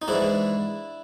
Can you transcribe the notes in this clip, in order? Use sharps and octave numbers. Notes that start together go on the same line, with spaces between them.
D#4
G#2 E3 D4 E4